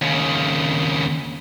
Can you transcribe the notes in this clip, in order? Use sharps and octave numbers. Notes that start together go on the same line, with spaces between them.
D#2 C#3